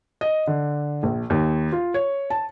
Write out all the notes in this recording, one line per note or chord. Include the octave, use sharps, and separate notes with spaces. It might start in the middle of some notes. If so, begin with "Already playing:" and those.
D#5
D3
A#1
D#2
F4
C#5
A5